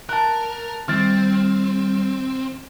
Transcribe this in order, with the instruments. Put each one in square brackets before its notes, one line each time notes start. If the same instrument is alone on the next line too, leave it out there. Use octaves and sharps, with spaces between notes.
[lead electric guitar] A#4 [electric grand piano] A5 F#6
[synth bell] D#3 C6 [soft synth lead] G3 [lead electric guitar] C4 [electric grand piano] F6 A6